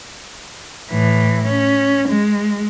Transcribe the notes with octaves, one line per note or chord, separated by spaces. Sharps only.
A2 E3
C#4
G#3